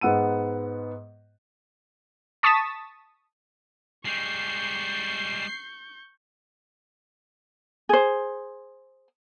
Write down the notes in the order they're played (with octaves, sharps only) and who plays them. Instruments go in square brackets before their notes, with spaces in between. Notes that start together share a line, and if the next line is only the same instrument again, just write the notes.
[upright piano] G#2 G#3 B3 F#5 E6 D#7
[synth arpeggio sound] A5 C#6 D#6 A6 B6 E7
[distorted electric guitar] G3 G#3 [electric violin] C#6 G6 [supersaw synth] C7
[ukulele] G#4 C5